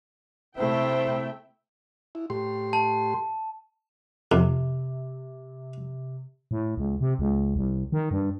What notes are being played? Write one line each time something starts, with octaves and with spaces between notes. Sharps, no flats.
C3 A3 E4 C5 E5 G5
E4
A2 G4 C6
A5
F2 C3
A2
C#2
C3
C#2
C2
D#3
G2